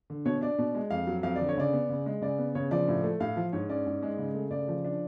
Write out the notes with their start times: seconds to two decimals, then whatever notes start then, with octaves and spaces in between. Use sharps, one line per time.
0.10 D3
0.25 B2 C#5
0.41 D4 D5
0.58 B2
0.75 G#3
0.91 F2 F5
1.07 F#3
1.23 F2 F5
1.36 D3 D5
1.49 C#5
1.57 C#3 D5
1.73 B3
1.90 C#3
2.06 G#3
2.22 C#3 D5
2.39 B3
2.55 C#3 C#5
2.71 F3 D5
2.88 A2
3.04 A3
3.20 A2 F5
3.36 F3
3.53 G#2 C#5
3.69 C#4 D5
3.86 G#2
4.02 G#3
4.18 C#3
4.34 A3
4.51 C#3 D5
4.68 F3
4.84 D4